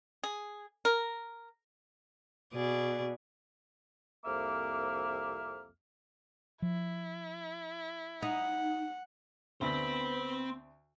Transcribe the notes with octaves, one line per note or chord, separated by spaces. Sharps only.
G#4
A#4
B2 G#4 D5
C2 F2 A#3 E5 D6 F6
F3 E4
D#4 F#5
D2 B3 C4 C5 B5